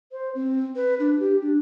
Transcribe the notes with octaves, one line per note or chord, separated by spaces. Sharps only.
C5
C4
B4
D4
G4
D4